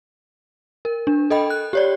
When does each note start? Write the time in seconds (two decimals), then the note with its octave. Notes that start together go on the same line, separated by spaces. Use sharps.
0.85 A#4
1.07 D4
1.30 A4 D#5 G5 B5
1.50 F#6
1.73 G4 C#5 D5